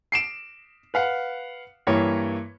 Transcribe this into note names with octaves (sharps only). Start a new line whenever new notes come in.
C7 D7 E7
B4 F5 F#5
G2 E3 A#3 C#5